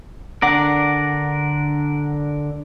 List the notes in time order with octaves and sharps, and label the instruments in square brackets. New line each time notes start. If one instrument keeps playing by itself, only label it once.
[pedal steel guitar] D3 D4 A#4 [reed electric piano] F#5 D6